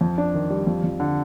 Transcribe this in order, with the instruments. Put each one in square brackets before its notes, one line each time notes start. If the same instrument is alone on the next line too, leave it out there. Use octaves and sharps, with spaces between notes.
[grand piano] F2
D4
D#3
G3
F2
F2
D3